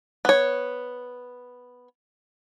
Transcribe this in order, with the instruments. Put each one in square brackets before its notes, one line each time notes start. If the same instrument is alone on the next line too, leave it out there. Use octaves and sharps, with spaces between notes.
[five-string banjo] B3 C#5